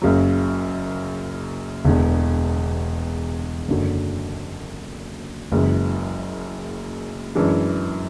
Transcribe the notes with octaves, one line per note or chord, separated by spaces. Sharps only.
F#1 F#2 C#3 F#3
E1 E2 D3
F#1 F#2 D3 F#3
F#1 F#2 E3 G#3
F#2 E3 G#3 D4